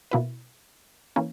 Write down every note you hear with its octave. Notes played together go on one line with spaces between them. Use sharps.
B2 A#3 E4 B4
E3 A#3 C#4